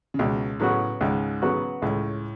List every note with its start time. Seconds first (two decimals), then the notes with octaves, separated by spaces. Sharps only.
0.14 C#3
0.19 C#2 B2
0.60 A2 C#3 F#3 B3 F#4
1.01 C#2 G#2
1.42 C#3 F#3 B3 F#4
1.82 C#2 A2